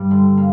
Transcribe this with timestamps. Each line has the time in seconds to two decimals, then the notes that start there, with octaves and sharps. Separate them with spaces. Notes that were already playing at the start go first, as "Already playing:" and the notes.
Already playing: G2 G3
0.11 D3
0.37 A#3